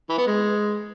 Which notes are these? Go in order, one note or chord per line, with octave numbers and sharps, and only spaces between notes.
E3
B3
G#3